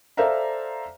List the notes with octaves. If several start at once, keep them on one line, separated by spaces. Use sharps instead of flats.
A4 C5 D5 E5 F5 A#5